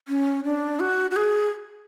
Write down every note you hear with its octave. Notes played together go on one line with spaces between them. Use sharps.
C#4
D4
F#4
F#4
G#4